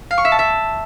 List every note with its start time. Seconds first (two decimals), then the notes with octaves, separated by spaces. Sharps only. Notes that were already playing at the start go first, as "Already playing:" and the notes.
0.11 F5
0.18 C#6
0.25 E5
0.32 A5
0.39 E5